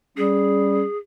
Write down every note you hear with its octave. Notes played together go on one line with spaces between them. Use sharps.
G3 C#4 G#4